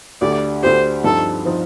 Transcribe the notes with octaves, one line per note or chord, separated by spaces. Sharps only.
D2 D3 A3 D4 G4 D5
D2 D3 A3 D4 G4 C5
G2 F3 C4 D#4 A4
F3 C4 D#4